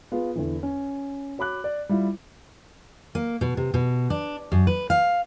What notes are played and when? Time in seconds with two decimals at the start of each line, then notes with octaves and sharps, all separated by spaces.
0.12 B3 F4 G#4
0.35 E2 D3 E3
0.63 C#4
1.38 F#4 C#5 B5 D6 F#6
1.64 D5
1.89 G3 E4 F4
3.15 A#3
3.41 B2
3.57 C3
3.74 B2
4.10 D4
4.52 F#2
4.67 B4
4.90 F5